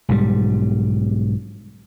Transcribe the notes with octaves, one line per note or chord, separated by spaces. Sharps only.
B1 G#2 G3